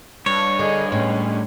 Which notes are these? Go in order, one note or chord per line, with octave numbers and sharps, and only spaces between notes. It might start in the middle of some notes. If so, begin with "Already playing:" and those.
G2 C#5
D3 G#4 D#5
A2 G#3 C#4